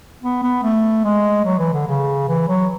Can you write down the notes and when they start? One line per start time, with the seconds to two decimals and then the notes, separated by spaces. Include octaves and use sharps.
0.23 B3
0.43 B3
0.64 A3
1.04 G#3
1.45 F#3
1.59 E3
1.73 D3
1.88 C#3
2.29 E3
2.49 F#3